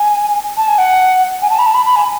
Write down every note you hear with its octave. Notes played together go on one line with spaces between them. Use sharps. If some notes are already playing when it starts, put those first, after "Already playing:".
Already playing: G#5
A5
G#5
F#5
G#5
A5
B5
A5
B5
B5
G#5